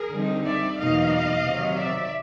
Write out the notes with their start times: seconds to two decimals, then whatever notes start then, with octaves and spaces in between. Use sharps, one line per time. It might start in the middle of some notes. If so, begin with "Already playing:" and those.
Already playing: G#4 A#4
0.13 D3 G3 C4 D#4
0.46 D5 E5
0.78 E2 B2 F#3 A#3 D#4 D#5 F5
1.44 C3 D#3 F#3
1.77 D5 E5